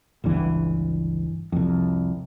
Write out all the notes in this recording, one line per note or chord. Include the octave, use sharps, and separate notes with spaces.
G1 C#2 G2 E3
C2 F2